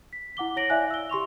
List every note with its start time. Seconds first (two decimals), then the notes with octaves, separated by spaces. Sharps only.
0.13 B6
0.37 E4 F#5 D6 G7
0.56 E4 C#5 A#6 D7 F#7
0.70 E4 D5 E5 F5 G#5 F#6
0.91 E6 G7
1.10 G4 C6 C#6 F7